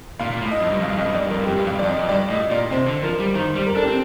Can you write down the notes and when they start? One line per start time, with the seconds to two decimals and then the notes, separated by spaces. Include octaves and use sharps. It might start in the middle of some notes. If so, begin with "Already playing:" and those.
0.19 A#2 F5
0.31 A#2
0.42 A2
0.51 D#5
0.62 F2
0.70 G2
0.79 F2
0.82 F5
0.88 G2
0.93 F5
0.97 F2 D#5
1.04 G2
1.13 F2 D5
1.22 G2
1.30 F2 A#4
1.39 G2
1.46 F2 G4
1.56 G2
1.65 F2 F5
1.73 G2
1.79 F2 D5
1.87 D#5
1.98 F2
2.09 G2 D5
2.30 A2 D#5
2.51 A#2 D5
2.71 C3 C5
2.87 D3
3.03 F3 A#4
3.20 G3
3.35 D#3 C5
3.50 C5
3.55 G3
3.67 A#4
3.76 D4 A4
3.82 G4
3.87 C4